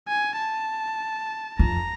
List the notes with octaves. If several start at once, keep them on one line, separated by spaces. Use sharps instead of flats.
G#5
A5
F2 A#5